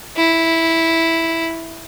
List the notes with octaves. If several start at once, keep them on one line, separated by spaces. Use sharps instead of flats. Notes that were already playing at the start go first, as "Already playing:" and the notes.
E4